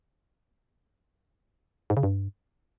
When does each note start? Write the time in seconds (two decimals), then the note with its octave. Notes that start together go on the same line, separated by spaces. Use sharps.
1.90 G#2
1.97 C#3
2.03 G2